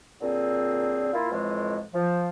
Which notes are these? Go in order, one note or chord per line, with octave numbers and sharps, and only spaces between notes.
A#2 D3 F#3 C4 G#4
A#3 E4 F4
F2 A2 E3 G#3
F3